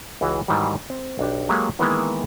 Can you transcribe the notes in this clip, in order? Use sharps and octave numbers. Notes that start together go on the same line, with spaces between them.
C#2 E3 F#4 G#4 F5
G#2 D#3 E3 F#3 G3
C4
B1 D4 G4
F#3 G#3 A#3 G4 A4 F5
D#3 E3 G#3 A#3 B3 E4